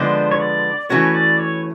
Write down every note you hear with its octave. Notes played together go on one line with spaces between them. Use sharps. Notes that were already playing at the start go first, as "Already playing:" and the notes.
Already playing: D3 F3 G#3 B3 D4 C5
C#5
D5
E3 A3 C#4 F#4 B4 C#5
D5
C#5